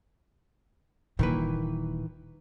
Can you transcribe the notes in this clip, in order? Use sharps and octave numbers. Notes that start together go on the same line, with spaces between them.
D#1 A#2 D#3 E3 B4